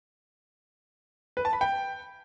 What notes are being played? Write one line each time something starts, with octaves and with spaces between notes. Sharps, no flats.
B4
A5
B5
G5